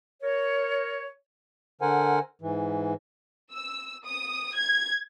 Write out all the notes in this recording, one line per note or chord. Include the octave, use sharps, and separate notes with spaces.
A#4 C#5
D3 A#4 C5 F#5 G#5
G#2 E3
E6
D#6
G#6